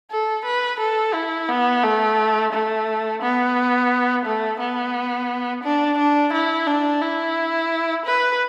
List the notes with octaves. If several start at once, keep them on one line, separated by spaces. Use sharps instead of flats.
A4
B4
A4
E4
B3
A3
A3
B3
A3
B3
D4
D4
E4
D4
E4
B4